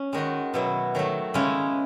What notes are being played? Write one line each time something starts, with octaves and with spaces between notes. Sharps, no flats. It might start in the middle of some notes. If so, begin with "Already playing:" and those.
Already playing: C#4
D#3 G#3 D#4 F#4
B2 F#3 B3 E4
D#3 F#3 A3
C#3 G#3 C#4 E4